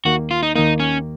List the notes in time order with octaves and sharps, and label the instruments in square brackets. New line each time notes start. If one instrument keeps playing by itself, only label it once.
[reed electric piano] D#2 D#3 A#3 [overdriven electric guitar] F#4
[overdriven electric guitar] F4
D#4
[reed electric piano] D#2 D#3 A#3 [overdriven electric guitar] D#4
[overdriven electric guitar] C#4